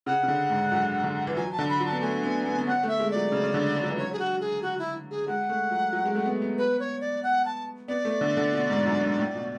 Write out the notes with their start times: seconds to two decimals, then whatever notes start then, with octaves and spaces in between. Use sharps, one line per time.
0.06 C#3 F#5
0.23 C#3
0.28 D3
0.50 G#2
0.72 F#2
1.04 D3
1.27 E3
1.37 F#3 G#5
1.52 A5
1.59 D3
1.69 B5
1.80 F#3
1.86 A5
1.92 B3
2.02 A3 G#5
2.24 B3
2.46 B3
2.58 B3
2.67 C#4 F#5
2.83 A3
2.88 E5
3.00 G#3
3.11 F#3 D5
3.32 C#3
3.44 C#3
3.54 D3
3.75 G#3
3.83 F#3
3.90 E3
3.97 F#3 C#5
4.13 G#4
4.19 F#4
4.41 G#4
4.62 F#4
4.79 E4
5.11 G#4
5.28 G#3 F#5
5.49 A3
5.71 F#3
5.93 F#3
6.05 G#3
6.15 A3
6.26 B3
6.42 B3
6.58 B4
6.80 C#5
7.01 D5
7.23 F#5
7.45 A5
7.88 B3 D5
8.05 A3
8.21 D3
8.37 D3
8.53 B2
8.70 G#2
8.86 F#2
9.02 G#2
9.19 A2
9.35 B2